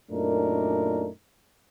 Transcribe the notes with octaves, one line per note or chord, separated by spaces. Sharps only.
F#2 A#2 A3 D4 D#4 A#4